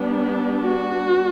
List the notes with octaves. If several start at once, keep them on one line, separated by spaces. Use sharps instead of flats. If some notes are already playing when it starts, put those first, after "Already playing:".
Already playing: G3 B3 D4
F#4